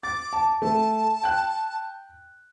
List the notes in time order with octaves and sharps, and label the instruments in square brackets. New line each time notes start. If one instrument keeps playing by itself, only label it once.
[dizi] D6 [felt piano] A6
[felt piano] A5
[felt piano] A3 [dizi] A5
[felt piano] G5 F#6